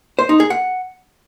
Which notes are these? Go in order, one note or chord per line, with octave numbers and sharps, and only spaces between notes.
C5
D#4
G#4
F#5